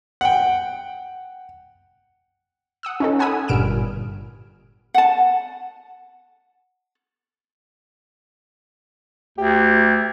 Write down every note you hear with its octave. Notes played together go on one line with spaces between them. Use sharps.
F#5 G5
F#5 D#6 E6
C#4 D#4 A4
F#5 G#5 B5 D#6 E6
G1 G2 A#2 F6 D7 E7
F#5 A5
D2 G4